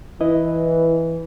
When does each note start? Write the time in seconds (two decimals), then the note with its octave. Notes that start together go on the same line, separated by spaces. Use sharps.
0.21 E3 E4 B4 D#5